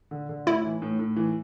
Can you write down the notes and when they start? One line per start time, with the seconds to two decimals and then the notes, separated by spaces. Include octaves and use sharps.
0.11 D3
0.29 D3
0.46 A2 E4
0.64 E3
0.82 A2
0.99 A2
1.16 E3